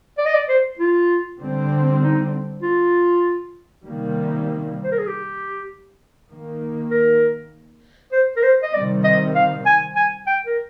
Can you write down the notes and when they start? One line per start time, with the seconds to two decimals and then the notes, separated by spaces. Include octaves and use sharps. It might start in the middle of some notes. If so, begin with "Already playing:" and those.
0.18 D5
0.26 D#5
0.34 D5
0.49 C5
0.79 F4
1.40 D3 G3 C4
2.02 D#4
2.63 F4
3.85 C3 D#3 G3 A#3
4.84 C5
4.92 A#4
4.99 G#4
5.07 G4
6.29 D#3 A#3
6.91 A#4
8.13 C5
8.37 A#4
8.43 C5
8.63 D#5
8.74 C3 D#3 G3 C4 D5
9.04 D#5
9.35 F5
9.66 G#5
9.96 G#5
10.27 G5
10.46 A#4